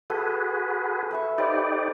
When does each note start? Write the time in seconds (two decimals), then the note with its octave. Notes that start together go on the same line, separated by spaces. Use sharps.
0.10 F#4 G#4 A4 B4 D#6
1.11 B4 E5 C#6
1.38 D#4 G4 B4 C5 D5 F5